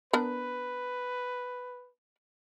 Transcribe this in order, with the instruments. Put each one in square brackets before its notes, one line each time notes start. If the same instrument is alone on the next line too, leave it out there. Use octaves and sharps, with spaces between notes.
[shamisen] B3 D4 A#4 [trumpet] B4